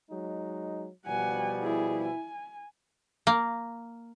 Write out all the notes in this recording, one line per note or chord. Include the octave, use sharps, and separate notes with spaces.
F#3 G#3 D#4
B2 F3 G3 F#5 G#5
E4 G#4
G#5
A#3